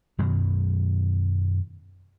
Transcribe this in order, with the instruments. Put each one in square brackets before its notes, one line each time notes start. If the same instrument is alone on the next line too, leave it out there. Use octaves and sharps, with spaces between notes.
[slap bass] F#2 B2 D#3 F#3